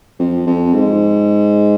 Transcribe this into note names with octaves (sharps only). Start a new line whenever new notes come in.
F2
F2
G#2